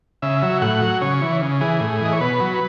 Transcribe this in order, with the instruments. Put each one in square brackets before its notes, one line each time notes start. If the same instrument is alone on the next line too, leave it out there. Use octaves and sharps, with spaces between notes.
[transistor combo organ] C#3 E5
F#3
A2 F#5
F#3
C#3 C#5
E3
C#3
E3 G#4
A2
E3 D#5
C#5
B2 B4
F#3